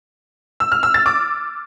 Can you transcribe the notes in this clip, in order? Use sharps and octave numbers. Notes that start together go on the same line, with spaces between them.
E6
F6
E6
A6
D6